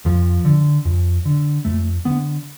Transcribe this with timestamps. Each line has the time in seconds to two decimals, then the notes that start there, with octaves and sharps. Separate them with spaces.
0.05 F2 F3
0.45 D3
0.85 F2
1.25 D3
1.65 F2 A3
2.05 D3 B3